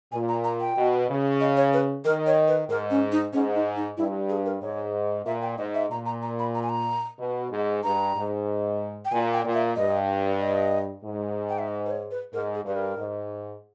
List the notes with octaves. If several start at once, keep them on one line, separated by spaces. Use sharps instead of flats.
A#2 G#5
A#5
A#5
G5
B2
C#3
D#5
C#5
B4
D#3 A#4
C#5
B4
G#2 A#4
C#4
D#4
G#2 C#4
D#4
D#4
G2 E4
G#4
A#4
G#2 C#5
A#2 E5
G5
G#2 D#5
E5
A#2 A#5
A#5
A#5
B5
A#5
G#5
A#5
B2
G#2
G2 A#5
G#2
G5
A#2 G#5
G5
A#2
E5
G2 D#5
D#5
G#2
G5
E5
D#5
B4
C#5
B4
G#2 A#4
G#4
G2 B4
A#4
G#2